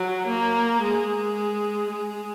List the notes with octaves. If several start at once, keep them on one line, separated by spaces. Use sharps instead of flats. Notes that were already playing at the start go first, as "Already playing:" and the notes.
Already playing: F#3
A#3
G#3
G#3